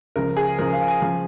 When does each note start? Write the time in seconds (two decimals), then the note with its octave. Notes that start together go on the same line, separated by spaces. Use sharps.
0.16 C#2 C#3 F3 A#4
0.37 G#4
0.59 C#2 C#3 F3 A#4
0.73 F5
0.88 G#5
1.02 C#3 F3